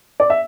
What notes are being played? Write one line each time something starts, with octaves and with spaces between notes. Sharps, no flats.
D5
E5